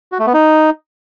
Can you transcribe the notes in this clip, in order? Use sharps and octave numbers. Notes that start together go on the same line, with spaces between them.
F#4
A3
B3
D#4